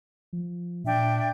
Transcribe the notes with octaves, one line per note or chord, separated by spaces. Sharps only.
F3
A#2 D4 E5 G5